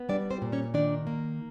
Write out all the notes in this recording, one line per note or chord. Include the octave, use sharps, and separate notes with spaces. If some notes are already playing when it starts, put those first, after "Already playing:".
Already playing: B3
G3 D4 D5
C4 C5
A#2
C#4 C#5
D#3 D4 D5
A#3